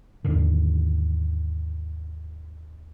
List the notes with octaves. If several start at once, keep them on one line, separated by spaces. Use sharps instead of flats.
D#2 G#2 D3 D#3